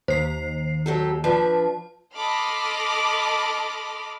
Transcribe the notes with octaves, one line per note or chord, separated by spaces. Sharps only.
D#2 C5 C7
F#3 G4 A4
F3 D4 B4 A5
A4 D#5 B5 C6 D6 F6